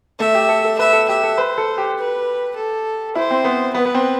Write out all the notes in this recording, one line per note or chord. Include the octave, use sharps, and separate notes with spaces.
A3 E5
G4
A4
A4
B4 E5
A4
G4 E5
A4
B4 C5
A4
G4
B4
A4
E4 C5
C4
B3
B3 B4
B3
C4